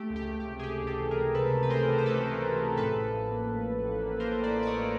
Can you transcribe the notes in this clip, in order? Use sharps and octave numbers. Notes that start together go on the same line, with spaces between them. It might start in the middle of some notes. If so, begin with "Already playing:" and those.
Already playing: A3 G4
C#2
G4
C#2
G4
C3
G#4
C3 G4
C#2
G4 A4
E3
G#4 A#4
C#2
C3 A4 B4
E3
B4
E3 A#4 C5
C3
C5
A3 A4 B4
C#2
E3
E3
A2 A4 B4
A1
F3
A#3
A2
A1
A2
A#3
A#3 A#4 C5
A2
C5 D5
F3
D5
C#5 D#5
A2